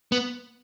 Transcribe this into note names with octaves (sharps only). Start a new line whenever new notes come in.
B3